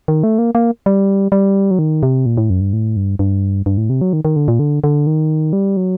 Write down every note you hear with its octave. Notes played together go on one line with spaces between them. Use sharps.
D#3
A3
A#3
A#3
G3
G3
F#3
D#3
C3
A#2
A2
F#2
G2
A2
G2
G2
G2
A2
C3
F#3
D#3
D#3
D3
A#2
D3
D3
D#3
G3
F#3